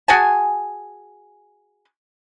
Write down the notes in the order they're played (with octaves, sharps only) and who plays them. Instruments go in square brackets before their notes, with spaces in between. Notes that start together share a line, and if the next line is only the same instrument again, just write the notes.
[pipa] F#4 G#4 G#5 A5